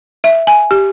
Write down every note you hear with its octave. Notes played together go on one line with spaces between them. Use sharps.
E5
G#5
G4